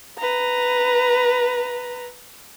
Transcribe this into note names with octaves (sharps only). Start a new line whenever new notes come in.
B4 A#5